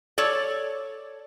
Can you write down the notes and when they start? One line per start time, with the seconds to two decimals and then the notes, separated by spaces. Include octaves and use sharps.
0.18 A4 C#5 D5